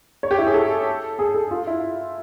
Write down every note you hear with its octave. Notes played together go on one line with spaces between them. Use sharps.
C#5
G4
E4
G#4
A4
G#4
A4
F4
E4